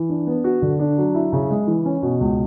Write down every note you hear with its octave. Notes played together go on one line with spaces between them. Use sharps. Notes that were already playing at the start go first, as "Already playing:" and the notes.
Already playing: E3
D4
B3
F#4
D3
D4
F#3
E4
C#3
G#3
E3
C#4
B2
C#2